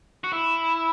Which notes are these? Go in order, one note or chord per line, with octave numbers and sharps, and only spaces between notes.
F#4
E4